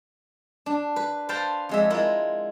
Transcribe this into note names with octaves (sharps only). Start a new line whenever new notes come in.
D4
B4
B4 C5 F5 G5 A5
F2 G#3 E5
G#3 E4 F4 A#4